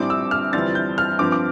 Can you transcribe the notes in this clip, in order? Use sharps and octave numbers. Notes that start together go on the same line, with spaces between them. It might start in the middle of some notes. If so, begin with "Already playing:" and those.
Already playing: A#1 A2 G3 C4 D6
E6
F6
G1 F2 E3 G3 C4 A6
G6
F6
G2 F3 C4 D6
D6